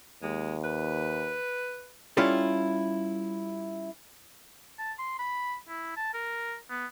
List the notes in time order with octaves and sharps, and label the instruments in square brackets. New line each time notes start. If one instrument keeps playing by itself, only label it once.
[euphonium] D#2 [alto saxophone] G#3
[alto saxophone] B4
[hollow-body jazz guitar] G3 C#4 E4 F4 G4 A4
[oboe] A5
C6
B5
E4
A5
A#4
B3